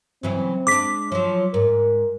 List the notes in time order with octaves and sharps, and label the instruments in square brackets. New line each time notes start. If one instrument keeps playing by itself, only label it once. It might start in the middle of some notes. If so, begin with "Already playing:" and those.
[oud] C#3 E3 F#3 [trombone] C4
[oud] G#3 D4 [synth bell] D6 B6
[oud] F3 F#3 [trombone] C#5
[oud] G#2 [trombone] A#4